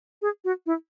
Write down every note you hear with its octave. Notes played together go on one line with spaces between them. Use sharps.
G#4
F#4
E4